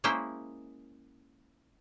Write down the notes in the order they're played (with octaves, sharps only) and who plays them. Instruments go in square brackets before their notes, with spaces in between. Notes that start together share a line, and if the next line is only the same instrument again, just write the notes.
[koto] G#3 A#3 C#4 E4 C5 G5